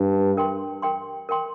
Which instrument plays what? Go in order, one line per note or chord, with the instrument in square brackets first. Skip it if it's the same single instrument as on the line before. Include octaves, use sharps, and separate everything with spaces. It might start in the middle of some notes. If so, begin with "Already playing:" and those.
Already playing: [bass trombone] G2
[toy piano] A#4 G5 C6
A#4 G5 C6
A#4 G5 C6